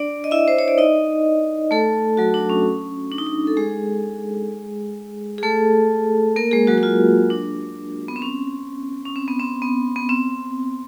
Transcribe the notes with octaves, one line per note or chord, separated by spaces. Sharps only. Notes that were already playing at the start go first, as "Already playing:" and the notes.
Already playing: D4 D5
D#5
E4 E5
C5
C#5
D5
D#4 D#5
A3 A4
F#3 F#4
D4
C#4
D4
D#4
D4
A4
G#3 G#4
G#4
A3 A4
A#3 A#4
G#3 G#4
F#3 F#4
F#4
F4
D4
B3
C4
C#4
C#4
C4
B3
C4
B3
B3
C4